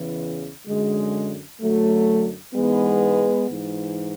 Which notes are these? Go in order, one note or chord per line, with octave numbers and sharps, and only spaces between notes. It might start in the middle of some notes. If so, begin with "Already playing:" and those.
Already playing: E2 C#3 E3
F#2 D3 G#3
F#2 D3 F#3 A3
G#2 E3 G#3 B3
G#2 E3